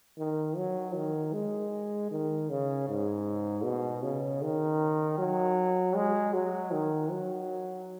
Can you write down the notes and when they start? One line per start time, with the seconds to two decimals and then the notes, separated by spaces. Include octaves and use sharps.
0.18 D#3
0.57 F#3
0.96 D#3
1.33 G#3
2.11 D#3
2.50 C#3
2.88 G#2
3.64 B2
4.03 C#3
4.42 D#3
5.18 F#3
5.96 G#3
6.34 F#3
6.72 D#3
7.11 F#3